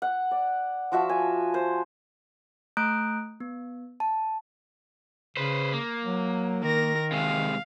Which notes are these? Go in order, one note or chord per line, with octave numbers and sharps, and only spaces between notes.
F#5
D5
F3 F#4 E5 A5
G#5
C5
A3 A#5 D#6 F#6 G6 D7
B3
A5
C#3 B4 C5
A#3
F#3
D#3 A#4 A#6
C3 G#3 F5